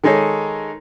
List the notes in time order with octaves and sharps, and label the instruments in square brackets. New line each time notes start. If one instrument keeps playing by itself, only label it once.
[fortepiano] D#3 G#3 D#4 G#4 A4 C#5